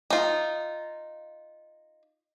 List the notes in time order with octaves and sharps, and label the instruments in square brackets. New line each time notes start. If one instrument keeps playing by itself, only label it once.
[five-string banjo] D#4 F4